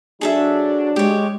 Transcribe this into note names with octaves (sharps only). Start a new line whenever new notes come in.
F#3 D4 F#4 G#4 A4 E5
G#3 G4 C#5